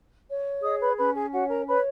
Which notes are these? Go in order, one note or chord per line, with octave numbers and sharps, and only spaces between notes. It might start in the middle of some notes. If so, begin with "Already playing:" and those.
C#5
G#4 D#5 D#6
B4 B5
C#4 B4 B5
G#4 G#5
F#4 C#5 F#5
A#4 A#5
B4 C#5 B5